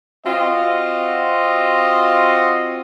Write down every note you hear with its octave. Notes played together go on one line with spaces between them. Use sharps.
C4 F4 F#4 D#5